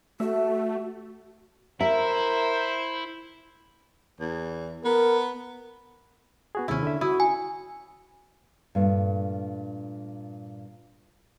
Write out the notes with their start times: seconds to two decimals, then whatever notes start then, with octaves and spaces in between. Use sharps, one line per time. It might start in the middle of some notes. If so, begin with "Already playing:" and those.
0.20 A3 F#4 E5
1.81 E4 A#4 C5 E5
4.20 E2
4.85 B3 A#4
6.55 B3 F#4 G#4
6.68 D#2 C3 C#4 E4 B5
6.83 D3 E5
7.01 E4 F#4 D#6
7.20 G#5
8.75 G2 A#2 A3